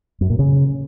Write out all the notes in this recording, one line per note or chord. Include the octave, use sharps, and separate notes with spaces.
F#2
A#2
C#3